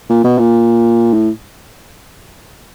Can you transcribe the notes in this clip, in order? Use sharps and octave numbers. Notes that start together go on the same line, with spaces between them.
A#2
B2
A#2
A2